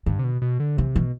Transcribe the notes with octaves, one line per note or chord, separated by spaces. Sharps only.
G2 D3
C3
B2
B2
D3
C3 E3
B2 E3